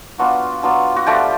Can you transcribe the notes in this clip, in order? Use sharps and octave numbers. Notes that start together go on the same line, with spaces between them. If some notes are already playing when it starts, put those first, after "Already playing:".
F#3 B3 D4 F4 F#4
F#3 B3 D4 F4
F#4
F3 G3 A3 D4 G4